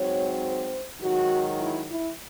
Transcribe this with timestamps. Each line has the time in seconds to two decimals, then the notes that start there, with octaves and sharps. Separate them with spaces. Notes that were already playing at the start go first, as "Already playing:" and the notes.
Already playing: G#2 F#3 C4 C#5
0.43 C5
1.01 G#2 D#3 F#3 F#4
1.60 E4
1.89 E4